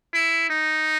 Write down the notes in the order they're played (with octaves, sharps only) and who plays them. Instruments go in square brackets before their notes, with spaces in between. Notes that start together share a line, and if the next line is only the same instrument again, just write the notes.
[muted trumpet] E4
D#4